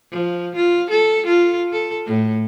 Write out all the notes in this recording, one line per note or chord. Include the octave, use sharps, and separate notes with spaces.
F3
F4
A4
F4
A4
A2